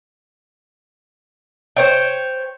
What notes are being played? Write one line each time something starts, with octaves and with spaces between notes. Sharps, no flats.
C5 C#5 G5